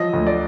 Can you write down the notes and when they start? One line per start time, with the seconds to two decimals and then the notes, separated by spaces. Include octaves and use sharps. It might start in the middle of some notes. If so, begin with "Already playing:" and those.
Already playing: F3 F#3 D#5
0.13 D2
0.27 D5